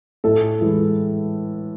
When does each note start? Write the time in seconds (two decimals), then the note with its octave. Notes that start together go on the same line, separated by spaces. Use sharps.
0.24 A2 A4
0.61 E3 G#3